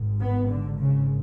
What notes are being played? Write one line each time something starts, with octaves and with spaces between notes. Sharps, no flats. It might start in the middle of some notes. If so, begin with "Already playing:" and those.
Already playing: G#1 G#2
B3
D3
C#3